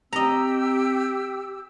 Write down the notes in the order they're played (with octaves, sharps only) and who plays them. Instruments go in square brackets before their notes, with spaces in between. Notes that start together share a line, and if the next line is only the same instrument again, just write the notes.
[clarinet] C4 [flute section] G4 E6 [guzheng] D#5 A#5